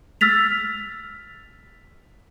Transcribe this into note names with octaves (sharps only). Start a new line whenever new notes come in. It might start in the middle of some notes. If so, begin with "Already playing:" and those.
E6 F6 A6 B6 F7